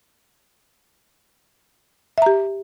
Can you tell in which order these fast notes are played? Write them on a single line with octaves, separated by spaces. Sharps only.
E5 A#5 G4